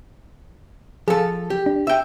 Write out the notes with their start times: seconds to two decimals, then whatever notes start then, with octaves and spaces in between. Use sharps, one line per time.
1.08 F3 G#4 A4
1.50 G4
1.66 D4
1.87 E5 G5